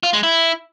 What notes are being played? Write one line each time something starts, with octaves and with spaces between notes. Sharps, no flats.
F4
G#3
E4